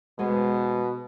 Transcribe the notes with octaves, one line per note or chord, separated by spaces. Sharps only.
B2 G#3 B3 C5